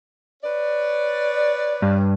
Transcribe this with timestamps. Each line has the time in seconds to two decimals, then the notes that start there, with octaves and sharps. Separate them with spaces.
0.43 B4 C#5 D5
1.82 G2